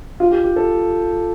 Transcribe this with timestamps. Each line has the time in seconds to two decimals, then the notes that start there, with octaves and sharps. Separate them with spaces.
0.20 F4
0.31 G4
0.44 G4
0.56 A4